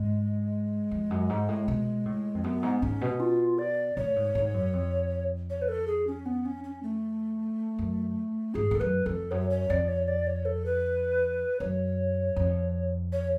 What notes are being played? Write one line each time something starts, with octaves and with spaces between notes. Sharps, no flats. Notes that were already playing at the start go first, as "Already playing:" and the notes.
Already playing: G#2 G#3
F2
F#2
G#2
A2
B2
A2
F2
F#2 B3
G#2
G#2 C#4
B2
F4
D5
A2 C#5
G#2
G#2
F#2
F2
C#5
B4
A4
G#4
C#4
B3
C#4
C#4
A3
F#2
G#2 G#4
G#2 A4
F#2 B4
F2 A4
F#2 C#5
C#5
F2 D5
C#5
D5
C#5
A4
B4
F#2 C#5
F2
C#5